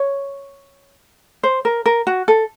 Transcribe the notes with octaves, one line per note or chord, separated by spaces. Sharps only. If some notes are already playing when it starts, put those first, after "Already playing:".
Already playing: C#5
C5
A#4
A#4
F#4
A4